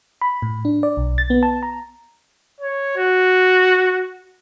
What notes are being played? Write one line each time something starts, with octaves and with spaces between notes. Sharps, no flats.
B5
A2
D4
D5
B1
A6
B3
A5
A#5
C#5
F#4